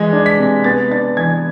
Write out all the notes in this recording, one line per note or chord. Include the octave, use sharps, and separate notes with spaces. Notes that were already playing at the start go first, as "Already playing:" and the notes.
Already playing: E3 G#3 G#6
D4
B6
C3
B3 A6
D4 A6
E3 G#6